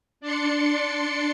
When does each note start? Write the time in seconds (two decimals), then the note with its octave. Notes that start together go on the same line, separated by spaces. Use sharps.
0.21 D4 D5 C6 C#7